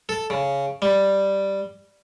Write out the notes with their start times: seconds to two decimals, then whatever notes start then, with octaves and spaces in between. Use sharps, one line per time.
0.09 A4
0.30 C#3
0.82 G3